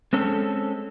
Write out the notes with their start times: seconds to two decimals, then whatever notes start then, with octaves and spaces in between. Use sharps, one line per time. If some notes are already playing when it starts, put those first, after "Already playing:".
0.13 G#3 C4 C#4 A4